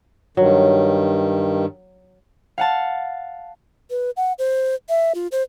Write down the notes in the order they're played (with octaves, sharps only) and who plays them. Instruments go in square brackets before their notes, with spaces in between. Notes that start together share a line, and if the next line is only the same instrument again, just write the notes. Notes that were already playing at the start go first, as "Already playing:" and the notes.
[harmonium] G2 D#3 [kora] F#3
[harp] F5 F#5 A5
[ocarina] B4
F#5
C5
E5
F4
C5